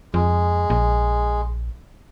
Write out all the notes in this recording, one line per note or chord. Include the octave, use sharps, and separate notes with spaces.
F2 G#3
A#1